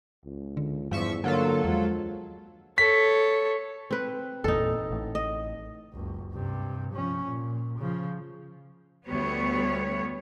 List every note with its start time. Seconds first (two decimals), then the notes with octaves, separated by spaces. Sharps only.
0.25 C#2
0.57 D3
0.91 E2 G2 F3 E5 C#6
1.24 D3 F#3 A#3 F4 A4
1.65 E2 F3 G#3
2.78 A4 C#5 B6
3.91 C4 B4
4.44 G1 E2 A#2 D#4 A4
4.91 A1 A2
5.15 D#5
5.94 F#1 C#2
6.33 G2 C3
6.93 F3 C#4
7.28 A#2
7.79 C#3 F3
9.07 D2 G3 B3 C#5